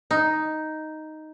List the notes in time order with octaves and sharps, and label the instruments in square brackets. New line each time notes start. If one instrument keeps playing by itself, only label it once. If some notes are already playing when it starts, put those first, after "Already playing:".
[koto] D#4